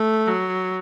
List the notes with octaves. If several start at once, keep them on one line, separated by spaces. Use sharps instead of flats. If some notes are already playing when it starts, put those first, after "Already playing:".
Already playing: A3
F#3